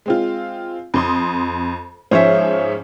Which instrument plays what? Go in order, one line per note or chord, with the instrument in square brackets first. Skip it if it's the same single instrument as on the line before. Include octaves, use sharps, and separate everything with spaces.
[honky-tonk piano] G#3 C4 F4
F2 C6 D#6
[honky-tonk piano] G#2 F3 C#4 [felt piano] C5 C#5 E5